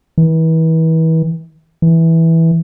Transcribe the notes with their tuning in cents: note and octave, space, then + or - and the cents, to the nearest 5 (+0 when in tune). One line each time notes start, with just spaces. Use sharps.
E3 -35
E3 -10